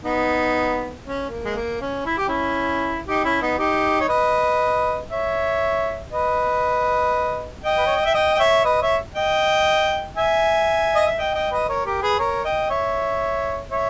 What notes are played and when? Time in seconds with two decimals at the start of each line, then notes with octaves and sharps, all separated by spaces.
0.04 B3 D#4
1.05 C#4
1.30 A#3
1.45 G#3
1.56 A#3
1.81 C#4
2.06 E4
2.18 G4
2.28 C#4 E4
3.07 D#4 G4
3.24 C#4 E4
3.41 B3 D#4
3.58 D#4 G4
4.01 C#5
4.08 B4 D#5
5.10 C#5 E5
6.11 B4 D#5
7.63 D#5 G5
7.77 B4
7.86 C#5
7.95 D#5
8.05 E5
8.14 D#5 G5
8.34 G5
8.39 C#5 E5
8.64 B4 D#5
8.82 C#5 E5
9.15 D#5 G5
10.16 E5 G#5
10.95 D#5
11.06 E5
11.18 D#5 G5
11.35 D#5 G5
11.51 B4 D#5
11.69 A#4 C#5
11.85 G4 A#4
12.02 G#4 B4
12.19 A#4 C#5
12.44 D#5 G5
12.70 C#5 E5
13.71 C#5 E5